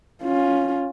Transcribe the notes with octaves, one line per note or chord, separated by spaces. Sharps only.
C#4 F4